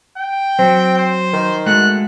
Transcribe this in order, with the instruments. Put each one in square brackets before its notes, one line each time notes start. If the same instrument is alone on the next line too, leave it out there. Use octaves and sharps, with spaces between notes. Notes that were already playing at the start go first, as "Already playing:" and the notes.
[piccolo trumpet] G5
[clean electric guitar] F#3 [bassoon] C4
[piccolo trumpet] C5
[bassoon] D#3
[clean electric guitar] G#3 A3 F#4 [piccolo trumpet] F#6